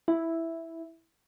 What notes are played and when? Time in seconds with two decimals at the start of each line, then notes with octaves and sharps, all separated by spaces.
0.08 E4